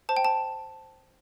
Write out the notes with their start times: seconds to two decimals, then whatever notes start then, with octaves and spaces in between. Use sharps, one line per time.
0.09 C5 A5
0.17 G5
0.25 A5